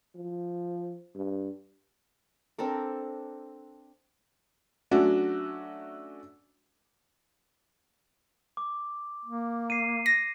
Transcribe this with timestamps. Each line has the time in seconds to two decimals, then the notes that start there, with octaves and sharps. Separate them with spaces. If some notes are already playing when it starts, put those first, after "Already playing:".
0.16 F3
1.15 G2
2.59 C4 D4 A4 A#4
4.91 F#3 A3 C#4 D4 F#4
8.57 D6
9.26 A#3
9.70 C7 D#7
10.06 A#6